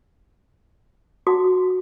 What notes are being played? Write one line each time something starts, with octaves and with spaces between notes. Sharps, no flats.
F#4